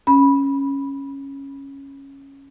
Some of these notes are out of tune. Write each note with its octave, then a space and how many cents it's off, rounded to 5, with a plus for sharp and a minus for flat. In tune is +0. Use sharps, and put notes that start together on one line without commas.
C#4 -10 B5 -10